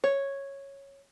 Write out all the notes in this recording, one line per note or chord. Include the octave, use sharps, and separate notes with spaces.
C#5